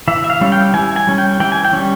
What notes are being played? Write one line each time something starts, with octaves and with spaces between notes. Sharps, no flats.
E3 E5
E5
F5
G3 C#4
G5
E3 G#5
G#5
G3 C#4
G5
E3 G5
G#5
G5
G3 C#4